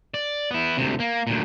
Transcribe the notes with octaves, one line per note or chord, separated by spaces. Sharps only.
D5
B3 E4
D2 C3
A#3
D2 A#2